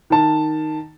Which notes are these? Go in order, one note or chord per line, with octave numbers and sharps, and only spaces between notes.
D#3 A5